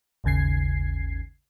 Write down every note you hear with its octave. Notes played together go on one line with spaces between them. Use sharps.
G#1 D#2 C#3 G#6 C7